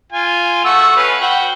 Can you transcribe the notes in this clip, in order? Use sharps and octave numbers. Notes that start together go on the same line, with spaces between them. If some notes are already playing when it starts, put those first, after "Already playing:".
F4 G#5
A3 F#4 E6
C#4 B4 F5
F#4 G5